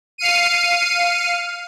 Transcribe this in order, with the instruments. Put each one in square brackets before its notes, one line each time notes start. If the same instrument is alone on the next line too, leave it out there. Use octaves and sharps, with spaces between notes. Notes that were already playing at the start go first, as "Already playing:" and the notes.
[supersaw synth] F5 F6 C7 C#7 D#7